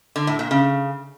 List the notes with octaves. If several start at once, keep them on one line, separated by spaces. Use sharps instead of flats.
D3
A2
A#2
C#3